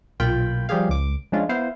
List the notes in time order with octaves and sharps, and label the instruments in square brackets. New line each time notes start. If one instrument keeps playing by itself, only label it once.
[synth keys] B1 A#2 F4 G5 B5
F3 G3 F4 G4 G#4 F5
C#2 D6
F3 G#3 C#4 D4 F4
B3 E4 C5 F5